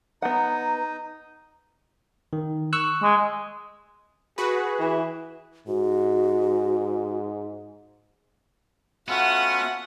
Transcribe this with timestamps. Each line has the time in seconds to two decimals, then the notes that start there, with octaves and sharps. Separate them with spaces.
0.22 B3 D#4 F#5 A#5
2.33 D#3
2.73 C#6 E6 F#6
3.02 G#3
4.38 F#4 G#4 B4
4.79 E3
5.68 G#2 F#4
9.08 A3 B3 C#4 F4 F#4 E5 F#5